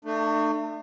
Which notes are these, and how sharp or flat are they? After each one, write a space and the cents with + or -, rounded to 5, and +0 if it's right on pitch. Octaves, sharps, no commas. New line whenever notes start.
A3 +25 D4 +45